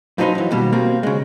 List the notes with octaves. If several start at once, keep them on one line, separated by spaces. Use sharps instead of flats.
F2 F3 F#3 D#4 B4 C6
F#2 E3
D#2 B2 G3
B2 A#3 C4
C#3 G#3